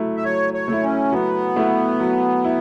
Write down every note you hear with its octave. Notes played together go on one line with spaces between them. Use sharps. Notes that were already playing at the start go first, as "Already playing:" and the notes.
Already playing: F#3 A3 E4
E5
F#3 C#5
C#5
A3 E4
C#4
F#3 B3
A3 E4
F#3
E4